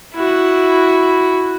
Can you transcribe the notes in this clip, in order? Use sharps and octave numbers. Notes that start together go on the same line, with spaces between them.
E4 F#4